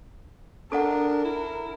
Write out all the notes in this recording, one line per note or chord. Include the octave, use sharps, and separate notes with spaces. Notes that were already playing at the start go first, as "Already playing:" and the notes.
D4 A4 A#4 F#5
E4